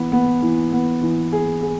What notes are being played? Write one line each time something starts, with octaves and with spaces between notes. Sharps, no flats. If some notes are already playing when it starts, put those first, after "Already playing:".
Already playing: E3 B3
B3
E3
B3
E3
G#4
G#4